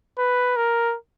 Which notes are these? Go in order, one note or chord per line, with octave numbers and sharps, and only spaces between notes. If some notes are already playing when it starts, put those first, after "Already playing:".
B4
A#4